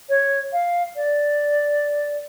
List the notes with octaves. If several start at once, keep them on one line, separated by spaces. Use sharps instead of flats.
C#5
F5
D5